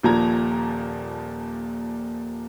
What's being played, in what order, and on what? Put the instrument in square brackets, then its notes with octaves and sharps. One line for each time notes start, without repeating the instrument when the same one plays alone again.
[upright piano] D#1 A#2 F3 A#5 G#6